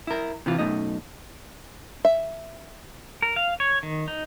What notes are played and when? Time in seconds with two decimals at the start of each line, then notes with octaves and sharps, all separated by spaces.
0.07 E4 A#4
0.46 C3 E3 F4
0.59 F#2 B2 A3 D#4 D#5
2.05 E5
3.22 A#4
3.36 F5
3.60 C#5
3.83 D#3
4.08 D#4